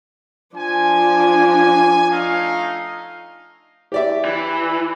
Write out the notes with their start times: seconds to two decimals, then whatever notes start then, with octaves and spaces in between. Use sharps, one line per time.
0.57 F3 D4 G#5
2.11 A3 D#4 F5
3.92 G4 D5 E5
4.25 E3